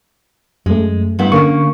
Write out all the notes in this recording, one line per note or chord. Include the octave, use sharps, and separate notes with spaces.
F#2 G#3 A3
G2 B3 E4
D3 A#3 C#4 C#6